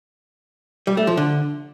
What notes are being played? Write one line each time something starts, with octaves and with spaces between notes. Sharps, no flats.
G3
A3
F3
D3